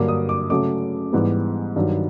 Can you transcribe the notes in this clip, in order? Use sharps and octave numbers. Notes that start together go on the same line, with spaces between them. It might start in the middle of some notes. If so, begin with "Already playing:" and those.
Already playing: G2 D3 F#3 A#3 D6
D#6
D6
C#3 F#3 A3 D6
G#2 E3 G3 B3
G2 D#3 F#3